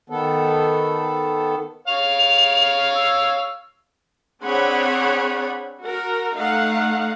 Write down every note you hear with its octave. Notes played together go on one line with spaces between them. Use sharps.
D#3 B3 A4
C#5 F5 F7
E6
C4 D4 G#4 C#5 F#5 B5
F#4 A#4
A3 D#4 F5 F#5